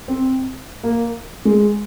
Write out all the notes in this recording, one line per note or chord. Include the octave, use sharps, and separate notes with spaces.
C4
A#3
G#3